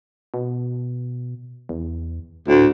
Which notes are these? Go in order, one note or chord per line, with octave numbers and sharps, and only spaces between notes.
B2
E2
D2 A2